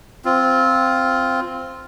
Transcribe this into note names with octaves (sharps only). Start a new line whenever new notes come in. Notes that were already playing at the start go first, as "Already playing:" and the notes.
C4 F4